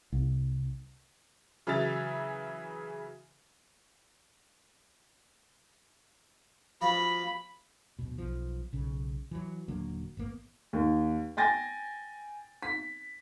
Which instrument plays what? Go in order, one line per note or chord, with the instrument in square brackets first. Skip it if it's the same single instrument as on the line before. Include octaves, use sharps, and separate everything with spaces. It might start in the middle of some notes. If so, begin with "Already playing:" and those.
[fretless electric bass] C2
[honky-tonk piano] C#3 E3 F#3 E5 A6 F7
[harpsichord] F3 F4 F#4 [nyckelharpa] B5
[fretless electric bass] D1 B2
B1 F3
B1 C#3
E3 F#3
D#1 D3 F#3 A#3
G#1 A#3 B3
[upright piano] D#2
G5 G#5 A6 A#6
B6